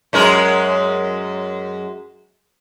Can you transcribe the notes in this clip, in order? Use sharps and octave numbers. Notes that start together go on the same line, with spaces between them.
F#2 G#3 A#4